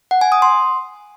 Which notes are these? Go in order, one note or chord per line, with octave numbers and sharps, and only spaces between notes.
F#5
G#5
D#6
C6